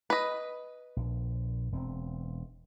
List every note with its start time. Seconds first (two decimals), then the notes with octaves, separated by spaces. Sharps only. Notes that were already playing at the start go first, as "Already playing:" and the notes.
0.10 B4 D#5
0.96 A#1
1.72 E1 C4